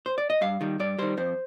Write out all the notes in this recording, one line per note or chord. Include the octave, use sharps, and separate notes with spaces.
C5
D5
D#5
G2 F5
D#3 G3
G2 D5
D#3 G3 C5
F2 C5